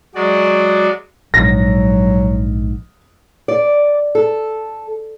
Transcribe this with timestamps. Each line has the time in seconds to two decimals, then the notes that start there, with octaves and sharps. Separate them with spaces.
0.15 F#3 G#3 F#4 D5
1.34 A#1 G#2 F#3 A#6
3.48 D5
4.15 A4